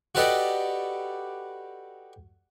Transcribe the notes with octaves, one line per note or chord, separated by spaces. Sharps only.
F#4 G4 A4 B4 D5 D#5